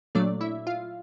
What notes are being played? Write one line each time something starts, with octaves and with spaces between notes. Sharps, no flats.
A#2 F#3 A3 D4 D5
E4 E5
F4 F5